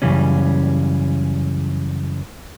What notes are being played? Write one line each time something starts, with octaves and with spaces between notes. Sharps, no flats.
F#2 A2 C#3 E3 G3 C#4